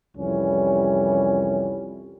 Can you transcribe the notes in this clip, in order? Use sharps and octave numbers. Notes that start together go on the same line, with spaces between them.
C2 F2 E3 G3 C#4